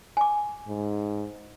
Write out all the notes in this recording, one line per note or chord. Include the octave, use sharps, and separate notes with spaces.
G#5 D6
G#2